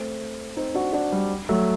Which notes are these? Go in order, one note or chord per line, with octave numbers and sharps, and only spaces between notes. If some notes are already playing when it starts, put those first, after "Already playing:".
Already playing: A3 C4
C4 D#4
D4 F#4
D4 F#4
G3
F#3 A3